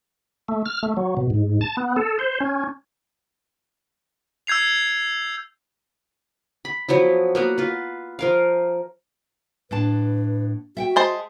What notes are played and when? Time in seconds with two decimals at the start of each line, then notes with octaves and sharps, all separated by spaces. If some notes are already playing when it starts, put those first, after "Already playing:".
0.48 A3
0.65 F6
0.83 A3
0.97 F#3
1.17 B2
1.30 G#2
1.61 A5
1.77 B3
1.96 A4
2.19 C5
2.40 C#4
4.47 E6 G6 G#6 C7 F7
6.65 B5
6.89 F3 F#3 B3 E4
7.35 A#3 B3 F#4
7.58 F4 B4
8.19 F3 A#4 F5
9.71 A2 D4 B4 A5
10.77 F#4 E5 F#5 G5
10.96 G#3 C5 A5